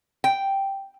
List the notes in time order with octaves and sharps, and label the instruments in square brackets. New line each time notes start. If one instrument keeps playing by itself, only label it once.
[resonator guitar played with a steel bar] G5